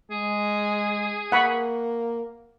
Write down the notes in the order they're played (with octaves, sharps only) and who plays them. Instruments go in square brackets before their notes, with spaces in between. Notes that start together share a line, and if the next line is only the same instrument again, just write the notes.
[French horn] G#3 [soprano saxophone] G#4
[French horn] A#3 [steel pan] F#5 B5 C#6